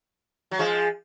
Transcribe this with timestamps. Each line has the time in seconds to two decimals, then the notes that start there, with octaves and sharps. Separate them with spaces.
0.51 F#3
0.59 F3 G#3